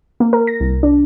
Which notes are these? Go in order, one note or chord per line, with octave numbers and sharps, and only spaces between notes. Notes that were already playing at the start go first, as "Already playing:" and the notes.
A#3
A#4
A#6
C2
D4